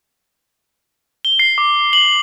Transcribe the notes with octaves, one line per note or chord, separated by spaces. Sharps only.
G7
C7
D6
F#7